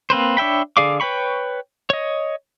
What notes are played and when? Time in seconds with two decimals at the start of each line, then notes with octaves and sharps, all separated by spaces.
0.10 A#3 C4 B4 C5
0.37 D4 C#5 E5 G5 B5
0.77 D3 G#4 D5 F5 D6
1.00 B4 C#5 G5 B5 C#6
1.90 C#5 D#5